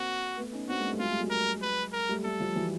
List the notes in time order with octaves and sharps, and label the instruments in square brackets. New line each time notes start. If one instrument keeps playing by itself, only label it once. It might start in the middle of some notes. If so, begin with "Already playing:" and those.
Already playing: [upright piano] A#3 C4 [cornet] F#4
[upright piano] A3 B3
C#4 D#4
[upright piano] C4 D4 [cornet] F#4
[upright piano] G#3 A#3
G3 A3
[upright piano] F#3 G#3 [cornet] F4
[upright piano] G3 A3
F#3 G#3
[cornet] A#4
B4
A#4
[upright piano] G3 A3
[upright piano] G3 A3 [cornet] A4
[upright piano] F3 G3
E3 F#3